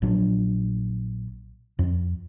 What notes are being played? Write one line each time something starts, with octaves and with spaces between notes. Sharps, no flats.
A#1 A#2 F#3 D4
F2